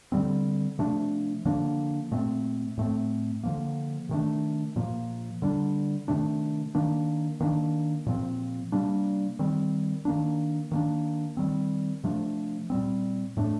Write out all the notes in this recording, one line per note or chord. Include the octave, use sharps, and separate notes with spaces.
D3 G3 C4
C3 F3 A3 D4
D3 F3 A#3 D4
A#2 A3 C4
A2 A3 C4
D3 F3 A#3
C3 D#3 A3 D4
A#2 F3 A#3
D3 G3 D4
C3 D#3 A3 D4
D#3 A#3 D4
D#3 A#3 D4
A#2 F3 C4
C3 G3 A#3 D4
D#3 G3 C4
D#3 A#3 D4
D#3 A#3 D4
D#3 G3 C4
C3 F3 A3 D4
A#2 G3 C4
A2 A3 D4